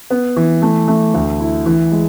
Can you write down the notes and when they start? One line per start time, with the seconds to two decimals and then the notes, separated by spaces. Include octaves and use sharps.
0.10 B3
0.36 E3
0.62 A3
0.88 A3
1.14 D2
1.40 E4
1.66 E3
1.92 G#3